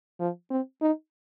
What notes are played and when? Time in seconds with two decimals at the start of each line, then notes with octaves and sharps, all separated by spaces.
0.20 F3
0.50 C4
0.82 D#4